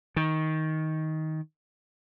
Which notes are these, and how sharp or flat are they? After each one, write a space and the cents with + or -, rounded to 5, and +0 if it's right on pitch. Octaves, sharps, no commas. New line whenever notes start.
D#3 +15